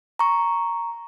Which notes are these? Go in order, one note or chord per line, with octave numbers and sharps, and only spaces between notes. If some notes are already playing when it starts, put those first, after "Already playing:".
A#5 C#6